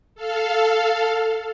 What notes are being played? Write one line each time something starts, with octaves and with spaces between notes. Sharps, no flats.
A4 F5